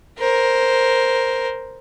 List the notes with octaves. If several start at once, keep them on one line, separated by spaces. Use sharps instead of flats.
A#4 C5